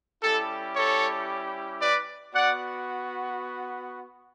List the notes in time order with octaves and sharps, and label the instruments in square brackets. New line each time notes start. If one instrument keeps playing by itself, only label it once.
[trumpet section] G3 C#4 E4 G4 A4
A4 C#5
B4 D5
B3 F#4 D5 F#5